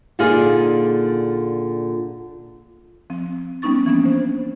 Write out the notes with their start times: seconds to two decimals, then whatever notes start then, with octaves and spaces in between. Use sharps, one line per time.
0.19 A#2 D3 D#4 F4 G#4 D5
3.10 F3 C4
3.62 G3 B3 C#4 D#4 C#6 A6
3.86 E3 F3 A#3 B3 C#4 D4
4.05 C5